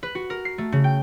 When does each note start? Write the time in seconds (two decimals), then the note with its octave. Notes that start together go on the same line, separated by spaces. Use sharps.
0.03 B4
0.15 F#4
0.30 A#4
0.45 C7
0.58 A3
0.72 C#3
0.84 G5